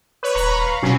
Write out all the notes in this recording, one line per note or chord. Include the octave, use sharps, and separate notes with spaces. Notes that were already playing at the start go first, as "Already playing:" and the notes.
B4 C#5
D#1 A#5 B5 C#6
F5
B2 F#3 C4 C#4